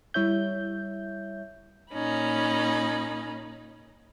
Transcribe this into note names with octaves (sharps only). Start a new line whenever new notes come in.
G3 E4 C#5 E5 G6
A#2 C#4 D#4 B5